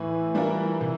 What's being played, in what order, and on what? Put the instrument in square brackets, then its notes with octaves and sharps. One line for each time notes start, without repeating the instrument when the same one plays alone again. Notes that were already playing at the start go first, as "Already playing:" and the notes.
Already playing: [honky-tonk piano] A2 [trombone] E3
[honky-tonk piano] G3 D4 F4 A#4
C3